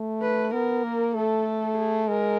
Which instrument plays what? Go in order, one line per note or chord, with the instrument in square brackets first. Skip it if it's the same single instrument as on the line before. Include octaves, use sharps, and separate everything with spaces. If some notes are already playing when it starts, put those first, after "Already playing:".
Already playing: [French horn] A3
[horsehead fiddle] B4
[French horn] B3 [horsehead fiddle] A#4
[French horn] A#3
[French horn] A3 [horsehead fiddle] A4
[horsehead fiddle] G#4
[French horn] G#3 [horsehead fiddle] A#4